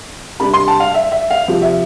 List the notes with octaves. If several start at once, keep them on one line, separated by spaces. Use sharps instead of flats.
C3 G3 D4 B5
C6
A5
F5
E5
E5
F5
C3 F3 C4
E5